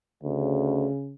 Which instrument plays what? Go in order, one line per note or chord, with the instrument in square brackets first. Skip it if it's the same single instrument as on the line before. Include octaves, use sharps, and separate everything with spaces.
[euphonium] D2 [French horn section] C#3